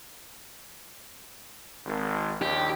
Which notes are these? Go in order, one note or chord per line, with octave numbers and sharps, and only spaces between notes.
G#1
A#1 D#2 G4